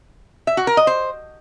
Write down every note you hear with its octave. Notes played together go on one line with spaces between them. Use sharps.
E5
F#4
A#4
D#5
C5